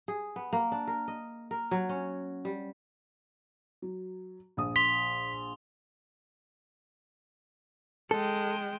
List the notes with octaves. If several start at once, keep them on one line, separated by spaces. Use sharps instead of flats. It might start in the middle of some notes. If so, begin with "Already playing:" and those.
G#4
B3
A#3
D4
A#4
D#5
A#4
F#3
C#4
G3
F#3
A#1 D#6
C6 B6 F7 G7
G#3 A4 G5